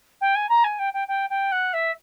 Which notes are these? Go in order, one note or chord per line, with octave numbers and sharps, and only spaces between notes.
G5
G#5
A#5
G#5
G5
G5
G5
G5
F#5
E5